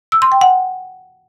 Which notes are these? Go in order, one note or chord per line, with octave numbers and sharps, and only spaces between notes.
E6
C6
G5
F#5